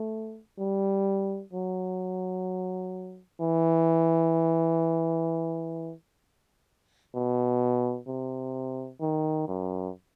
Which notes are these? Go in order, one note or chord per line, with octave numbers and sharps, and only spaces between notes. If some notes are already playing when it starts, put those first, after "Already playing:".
Already playing: A3
G3
F#3
E3
B2
C3
D#3
F#2